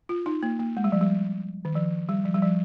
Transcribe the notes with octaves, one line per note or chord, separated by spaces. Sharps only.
F4
D#4
A#3
A#3
G#3
G3
F3
G3
D#3
F3
G3
F3
G3
F3